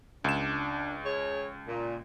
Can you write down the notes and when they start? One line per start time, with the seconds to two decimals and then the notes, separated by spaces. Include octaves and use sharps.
0.24 C#2 D4 E7
1.05 G#4 C#5
1.67 A#2